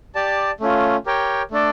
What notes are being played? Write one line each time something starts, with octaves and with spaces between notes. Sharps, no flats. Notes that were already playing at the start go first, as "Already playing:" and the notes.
G4 D5 A5
A3 C#4 F4
G4 A#4 C#5 G5
A3 D4 A4 D5